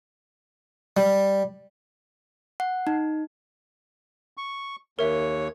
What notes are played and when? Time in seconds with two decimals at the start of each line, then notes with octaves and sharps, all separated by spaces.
0.97 G3
2.60 F#5
2.87 D#4
4.37 C#6
4.99 D#2 A#4 C#5 E5